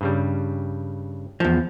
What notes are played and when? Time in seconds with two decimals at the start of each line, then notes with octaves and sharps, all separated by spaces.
0.01 G2 C#3 G3
1.40 E2 F3